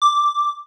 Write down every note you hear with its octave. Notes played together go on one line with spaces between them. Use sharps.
D6